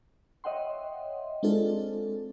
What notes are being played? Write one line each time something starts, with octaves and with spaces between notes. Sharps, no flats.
C#5 D#5 E5 F#5 G5 C6
G#3 C4 D4 F4 A4